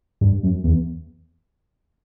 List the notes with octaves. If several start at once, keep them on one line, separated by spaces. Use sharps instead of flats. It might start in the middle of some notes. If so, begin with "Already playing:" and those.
G2
F#2
E2